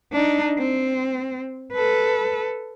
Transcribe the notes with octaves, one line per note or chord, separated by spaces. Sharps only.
D4 D#4
C4
A4 B4